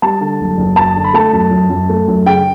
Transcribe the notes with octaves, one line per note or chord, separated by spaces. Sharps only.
G3 A5
D3
F#1
F#1
F#2 A5
D3
B5
A3 A5
F#2
F#2
F#2
A3
F#2
C#3 G5